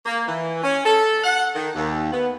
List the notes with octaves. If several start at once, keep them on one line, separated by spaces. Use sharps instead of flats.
A#3
E3
C#4
A4
F#5
D#3
D#2
B3